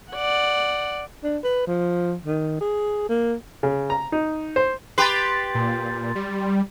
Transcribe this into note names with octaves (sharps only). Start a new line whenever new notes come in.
D5 F#5
D4
B4
F3
D#3
G#4
A#3
C#3
A#5
D#4
C5
G4 B4 C6 A6
A#2
G3